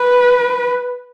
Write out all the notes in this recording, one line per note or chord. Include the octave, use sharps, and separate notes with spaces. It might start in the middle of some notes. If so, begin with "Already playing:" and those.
Already playing: B4